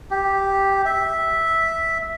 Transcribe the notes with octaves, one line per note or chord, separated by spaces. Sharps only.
G4
E5